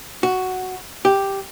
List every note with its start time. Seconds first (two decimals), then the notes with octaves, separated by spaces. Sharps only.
0.23 F#4
1.05 G4